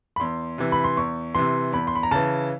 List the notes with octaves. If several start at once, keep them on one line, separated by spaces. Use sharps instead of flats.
B5
E2 C6
C3 E3
B5
C6
E2 C#6
C3 E3 C6
E2 B5
C6
B5
A#5
C#3 E3 A5